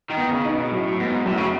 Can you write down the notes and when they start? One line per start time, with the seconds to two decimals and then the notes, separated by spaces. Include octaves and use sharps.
0.10 D#3
0.17 B3
0.31 C#3
0.45 D#4
0.51 B2
0.72 A2 F#3
0.99 G#2 B3
1.26 F#2 A2
1.37 C#3